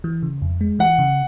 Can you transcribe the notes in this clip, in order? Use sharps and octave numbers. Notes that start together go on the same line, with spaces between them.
E3
C#3
F2
G#3
E3 F#5
C#3